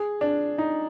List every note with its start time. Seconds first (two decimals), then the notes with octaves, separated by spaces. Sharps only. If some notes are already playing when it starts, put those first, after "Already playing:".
Already playing: G#4
0.21 D4
0.58 D#4